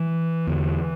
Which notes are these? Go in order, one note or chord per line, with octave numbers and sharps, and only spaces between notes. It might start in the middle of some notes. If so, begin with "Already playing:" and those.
Already playing: E3
E2 D3